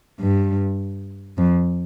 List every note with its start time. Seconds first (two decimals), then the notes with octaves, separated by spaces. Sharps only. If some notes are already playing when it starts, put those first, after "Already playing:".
0.20 G2
1.38 F2